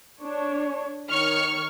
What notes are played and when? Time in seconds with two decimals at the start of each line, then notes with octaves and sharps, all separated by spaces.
0.21 D4 C#5
1.10 D#3 C#5 C#6 F6